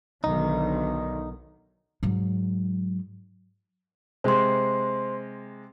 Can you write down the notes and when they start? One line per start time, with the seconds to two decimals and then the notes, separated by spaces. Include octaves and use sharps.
0.24 B1 D3 D#3 D#4
2.03 G#2 F#3
4.24 C3 G#3 C5 C6